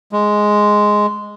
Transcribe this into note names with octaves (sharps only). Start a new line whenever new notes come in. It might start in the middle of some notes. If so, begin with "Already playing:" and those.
G#3